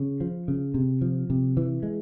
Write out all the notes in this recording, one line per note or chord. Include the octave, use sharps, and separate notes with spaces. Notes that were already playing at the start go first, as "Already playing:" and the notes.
Already playing: C#3
F3
C#3
C3
F3
C3
E3
G#3